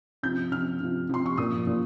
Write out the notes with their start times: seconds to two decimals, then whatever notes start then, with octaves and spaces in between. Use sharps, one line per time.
0.23 C3 F3 G6
0.52 C3 F3 F6
0.80 C3 F3
1.09 C3 F3 C6
1.26 C#6
1.38 A#2 F3 D#6
1.67 A#2 F3